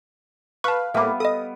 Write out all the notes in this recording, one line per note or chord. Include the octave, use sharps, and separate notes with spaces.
B4 F5 A5 C#6
A2 G3 A#3 B3 E5 D6
A4 D#5 D#6